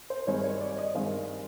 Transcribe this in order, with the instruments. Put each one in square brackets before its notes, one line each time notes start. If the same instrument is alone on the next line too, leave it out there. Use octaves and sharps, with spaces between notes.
[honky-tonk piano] C5
G2 D#3 G#3 C4 C#5
C#5
D5
D#5
G2 D#3 G#3 C4 F5